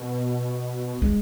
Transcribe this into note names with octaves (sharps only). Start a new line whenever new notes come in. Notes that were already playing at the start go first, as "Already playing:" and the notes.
Already playing: B2
G#3